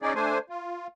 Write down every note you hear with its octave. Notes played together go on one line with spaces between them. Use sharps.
C#4 D#4 G#4 D5
A3 D4 C5 G#5
F4